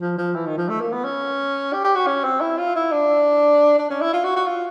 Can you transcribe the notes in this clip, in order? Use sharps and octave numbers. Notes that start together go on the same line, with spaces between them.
F3
F3
E3
D#3
F3
A3
A#3
B3
C#4
G4
G4
F#4
C#4
C4
E4
F4
E4
D4
D4
C#4
E4
F4
F#4
F#4
F4